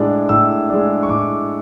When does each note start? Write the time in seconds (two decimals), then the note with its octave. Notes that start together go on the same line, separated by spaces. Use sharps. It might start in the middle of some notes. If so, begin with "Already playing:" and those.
Already playing: A2 G#3 D4
0.29 A2 E6
0.69 G#3 D4
1.03 C#6
1.09 A2 D6